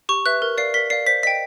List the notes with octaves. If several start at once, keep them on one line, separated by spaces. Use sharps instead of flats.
G4 C#6
B4 E5 F#6
A#4
D5 F5 C7
A#4 B6
D5 F5 C7
C5 B6
D#5 G5 B6